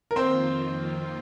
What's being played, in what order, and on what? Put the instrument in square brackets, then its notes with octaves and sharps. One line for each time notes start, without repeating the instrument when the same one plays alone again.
[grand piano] A#4
[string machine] F2 D#3 A#3 F4 [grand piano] C4 C5